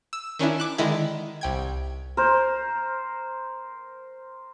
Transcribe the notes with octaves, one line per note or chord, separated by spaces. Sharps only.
E6
D#3 C#4 D4 E4
D6 F#6 E7
D3 D#3 G#3 E4
C2 G5 G#6
A#4 C5